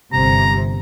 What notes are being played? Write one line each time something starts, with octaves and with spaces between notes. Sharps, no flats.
G1 C3 A#5